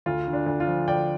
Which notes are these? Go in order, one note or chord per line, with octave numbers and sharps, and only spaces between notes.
D2 F4
D3
D4
D2
F4
F3
D2 D5 G5